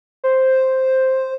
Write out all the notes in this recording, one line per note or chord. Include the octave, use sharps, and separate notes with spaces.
C5